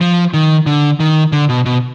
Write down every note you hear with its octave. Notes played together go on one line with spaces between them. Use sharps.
F3
D#3
D3
D#3
D3
B2
B2